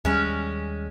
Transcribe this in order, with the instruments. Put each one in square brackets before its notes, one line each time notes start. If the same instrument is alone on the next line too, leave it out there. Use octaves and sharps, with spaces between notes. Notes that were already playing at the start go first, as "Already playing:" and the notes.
[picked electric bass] D#2 G3 [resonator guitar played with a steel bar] G#3 C#4